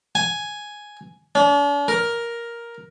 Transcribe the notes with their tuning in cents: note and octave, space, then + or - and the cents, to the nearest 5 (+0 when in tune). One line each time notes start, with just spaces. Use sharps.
G#5 +5
D4 -45
A#4 +5